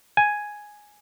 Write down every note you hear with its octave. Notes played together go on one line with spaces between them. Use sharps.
G#5